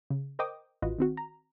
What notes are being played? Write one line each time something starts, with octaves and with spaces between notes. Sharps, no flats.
C#3
A#4 C5 D#5 G5 D6 D#6
A1 F4 F#4 B4 D#5
D#3 C4 F#4
A#5